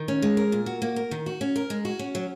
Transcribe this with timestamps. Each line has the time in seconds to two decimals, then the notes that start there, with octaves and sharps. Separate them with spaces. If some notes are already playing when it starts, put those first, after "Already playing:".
Already playing: D#3
0.08 C#4
0.22 G#3
0.37 A#4
0.52 A#2
0.66 F#4
0.82 A#3
0.96 A#4
1.11 D#3
1.26 F#4
1.41 C#4
1.56 A#4
1.70 G#3
1.85 F#4
1.99 C#4
2.15 F#3